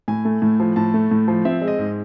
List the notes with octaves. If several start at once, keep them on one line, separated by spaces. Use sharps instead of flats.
A2 G#5
A3
A2
F3
A2 A5
A3
A2
F3
C4 E5
G#3
D#5
G#2